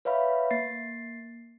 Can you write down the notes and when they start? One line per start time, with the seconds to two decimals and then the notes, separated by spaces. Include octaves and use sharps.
0.05 B4 C#5 E5 F5 B5
0.51 A#3 A6 C7